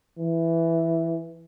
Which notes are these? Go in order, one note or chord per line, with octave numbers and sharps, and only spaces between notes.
E3